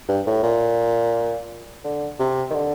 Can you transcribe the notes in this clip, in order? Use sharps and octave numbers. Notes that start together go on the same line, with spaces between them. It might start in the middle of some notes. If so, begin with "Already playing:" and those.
G2
A2
A#2
D3
C3
D#3
D3